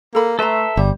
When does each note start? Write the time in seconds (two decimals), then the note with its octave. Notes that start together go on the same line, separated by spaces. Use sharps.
0.15 A#3 A4 B5
0.39 A3 A4 B4 E5 A#5 C6
0.77 G1 G3 C5